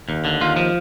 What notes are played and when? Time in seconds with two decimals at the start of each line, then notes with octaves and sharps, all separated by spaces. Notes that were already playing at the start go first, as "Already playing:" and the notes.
0.09 D#2
0.25 D3
0.41 D#2 F4
0.56 F3